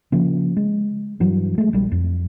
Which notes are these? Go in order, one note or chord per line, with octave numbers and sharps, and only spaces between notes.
C#3 F3 A#3
G#3
G2 E3 F#3
G#3 A3
A#1 G3
F2